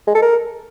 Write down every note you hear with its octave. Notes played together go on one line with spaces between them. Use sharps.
G#3
A4
A#4